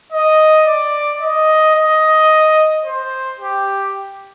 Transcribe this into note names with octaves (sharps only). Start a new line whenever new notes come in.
D#5
D5
D#5
D#5
C5
G4